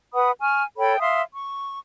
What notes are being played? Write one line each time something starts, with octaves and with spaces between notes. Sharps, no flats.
B4 F#5 B5 D#6
G#5 C#6 F6
A4 C#5 G5 B5
E5 F5 C6 D#6
C#6